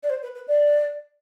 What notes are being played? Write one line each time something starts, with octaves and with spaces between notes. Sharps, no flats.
D5
C5
B4
B4
D5